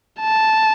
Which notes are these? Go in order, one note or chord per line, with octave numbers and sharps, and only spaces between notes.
A5